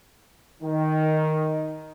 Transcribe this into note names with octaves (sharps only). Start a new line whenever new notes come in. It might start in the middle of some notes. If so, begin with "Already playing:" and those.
D#3